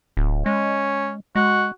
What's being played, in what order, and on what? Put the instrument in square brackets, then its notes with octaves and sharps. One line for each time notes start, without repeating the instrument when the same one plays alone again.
[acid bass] D1
[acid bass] G#3 [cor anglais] C#4
[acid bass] G#3 [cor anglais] F#4